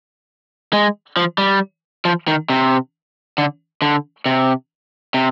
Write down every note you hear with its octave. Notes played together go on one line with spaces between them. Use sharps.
G#3
F3
G3
F3
D#3
C3
D3
D3
C3
C3